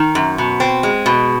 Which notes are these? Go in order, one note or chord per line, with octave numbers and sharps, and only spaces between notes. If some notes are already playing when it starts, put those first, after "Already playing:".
Already playing: D#3
F#2
B2
C4
G#3
B2